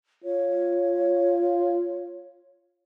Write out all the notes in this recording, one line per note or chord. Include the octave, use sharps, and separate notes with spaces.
F4 C#5